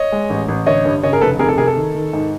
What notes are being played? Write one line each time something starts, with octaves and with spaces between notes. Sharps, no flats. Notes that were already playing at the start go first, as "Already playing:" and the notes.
Already playing: C#5 D#5
G#3
A1
A1
D3 C#5 D#5
G2
C#3 C#5 D#5
G#4 A#4
F1 A4 B4
C3 G#4 A#4
A4
C3 G#4 A#4
A4
D#3
D#3
G#2